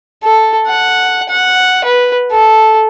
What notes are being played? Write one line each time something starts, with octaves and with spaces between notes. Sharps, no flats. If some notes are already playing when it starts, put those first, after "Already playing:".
A4
F#5
F#5
B4
A4